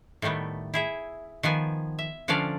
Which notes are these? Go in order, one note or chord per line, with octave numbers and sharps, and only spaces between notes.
A2 D#3 G3 A3 B3
E4 G#4 E5
D#3 F3 B3 G#5
E5
D3 F3 C#4 D4 D5 F5